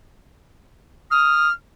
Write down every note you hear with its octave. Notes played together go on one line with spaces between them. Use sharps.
D#6 F6